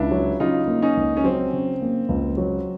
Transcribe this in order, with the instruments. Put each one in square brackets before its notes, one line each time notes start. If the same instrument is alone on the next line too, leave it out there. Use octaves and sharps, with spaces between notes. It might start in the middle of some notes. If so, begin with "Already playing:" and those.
Already playing: [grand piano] C#2 [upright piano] D4 E4
[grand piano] F#3
[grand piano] C#3 [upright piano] D#4 F4
[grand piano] A#3
[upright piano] C#4 D#4
[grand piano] C#2
[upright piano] C#4
[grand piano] F#3 [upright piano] C4
[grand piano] C#3
A#3
C#2
F#3